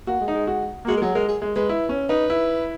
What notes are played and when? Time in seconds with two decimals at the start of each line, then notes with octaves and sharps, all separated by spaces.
0.07 A#3 F#4
0.21 G#3
0.28 D#4
0.35 G#3
0.47 F#4
0.85 A#3
0.88 G#3 F#4
0.97 A#4
1.02 F#3 G#4
1.15 G#3 A#4
1.29 G#4
1.42 G#3
1.56 G#3 B4
1.69 E4
1.89 C#4
2.09 D#4 B4
2.30 E4